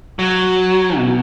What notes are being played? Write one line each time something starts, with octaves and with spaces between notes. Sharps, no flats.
F#3
B2